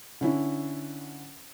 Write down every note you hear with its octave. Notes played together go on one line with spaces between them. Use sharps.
D3 C#4 E4